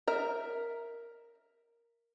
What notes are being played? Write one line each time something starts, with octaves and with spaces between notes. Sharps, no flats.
A#4 E5